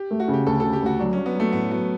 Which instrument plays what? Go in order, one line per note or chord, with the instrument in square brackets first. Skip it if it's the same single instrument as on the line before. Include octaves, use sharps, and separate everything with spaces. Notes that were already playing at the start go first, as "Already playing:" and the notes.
Already playing: [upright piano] G4
[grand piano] A3
[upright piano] F#4
[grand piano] C#3
[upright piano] G4
[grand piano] D2 [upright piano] A4
[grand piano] C#3 [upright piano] A4
[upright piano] G4
[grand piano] D2 [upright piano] F#4
[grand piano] F#3 [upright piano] D4
[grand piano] F#3 [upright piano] C#4
[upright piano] B3
[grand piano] F#3 [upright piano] A3
[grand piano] A2 [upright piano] B3
[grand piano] F#3 [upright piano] B3